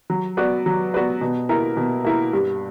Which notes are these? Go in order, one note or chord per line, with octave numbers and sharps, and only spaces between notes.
F#3
B3 F#4 B4 D5
F#3
B3 F#4 B4 D5
B2
A#3 E4 A#4
B2
A#3 E4 A#4
G2